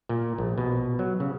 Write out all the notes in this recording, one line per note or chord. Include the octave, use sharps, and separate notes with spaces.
A#2
A#1
B2
F#3
C#3